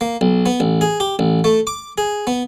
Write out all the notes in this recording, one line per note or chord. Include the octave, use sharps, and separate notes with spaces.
A#3
B1
B3
A1
G#4
G4
A1
A3
D6
G#4
B3